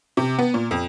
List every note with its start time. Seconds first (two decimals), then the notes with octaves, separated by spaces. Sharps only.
0.17 C3
0.39 B3
0.54 A#2
0.71 F2